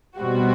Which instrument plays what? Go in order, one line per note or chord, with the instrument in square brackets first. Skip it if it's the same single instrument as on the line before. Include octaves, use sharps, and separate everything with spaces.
[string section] B2 G3 C4 F#4